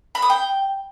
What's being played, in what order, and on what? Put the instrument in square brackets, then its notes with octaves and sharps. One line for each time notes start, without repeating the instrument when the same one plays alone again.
[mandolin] B5
D#6
G5